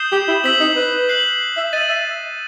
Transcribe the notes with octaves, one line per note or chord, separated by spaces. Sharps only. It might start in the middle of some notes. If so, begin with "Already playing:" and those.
Already playing: D#6 G6 C7 E7 G7
G4
E4
C4 E6 B6 F#7
D#4
B4
F#6 C7 F#7
E5
D#5 A6 D#7 F#7
E5